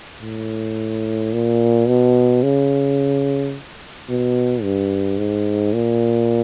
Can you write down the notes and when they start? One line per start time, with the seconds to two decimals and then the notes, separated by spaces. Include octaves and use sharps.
0.22 A2
1.33 A#2
1.88 B2
2.43 C#3
4.09 B2
4.63 G2
5.18 G#2
5.73 A#2